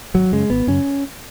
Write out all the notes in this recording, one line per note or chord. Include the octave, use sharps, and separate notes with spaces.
G#1 F#3
F#2 C#3 G#3
G#1 B3
F#2 C#3 C#4